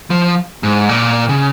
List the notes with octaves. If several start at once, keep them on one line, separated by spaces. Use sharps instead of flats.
F3
G#2
A#2
C#3